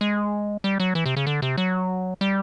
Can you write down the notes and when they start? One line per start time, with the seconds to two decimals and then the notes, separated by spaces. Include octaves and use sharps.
0.01 G#3
0.64 G3
0.80 F#3
0.95 E3
1.06 C3
1.16 C#3
1.27 D3
1.42 C3
1.57 F#3
2.21 G3